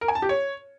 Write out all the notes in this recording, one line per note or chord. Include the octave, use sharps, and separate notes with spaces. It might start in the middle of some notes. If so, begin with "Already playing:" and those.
A#4
G#5
A5
G4
C#5